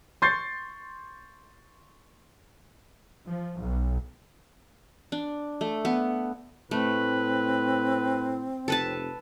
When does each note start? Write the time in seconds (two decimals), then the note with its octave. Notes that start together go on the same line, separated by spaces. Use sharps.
0.22 C6 C#6 G6 A6 C7
3.28 F3
3.59 B1
5.12 D4
5.61 A3
5.85 B3
6.71 A2 A3 C4 B4
8.68 F1 A4 B4 A5